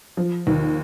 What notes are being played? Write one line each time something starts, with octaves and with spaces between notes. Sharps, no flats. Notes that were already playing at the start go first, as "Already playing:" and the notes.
F3
D#2